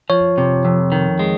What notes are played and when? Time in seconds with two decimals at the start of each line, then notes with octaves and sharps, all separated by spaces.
0.10 F3 C#5
0.38 C3
0.65 F2
0.92 D#3
1.19 G#3